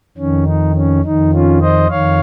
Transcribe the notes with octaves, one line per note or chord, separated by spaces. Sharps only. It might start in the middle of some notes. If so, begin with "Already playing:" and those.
F2 D#3 C#4
D#4
C#4
F2 D#3 D#4
C#4 F4
C5 D#5
F2 D#3 C#5 F5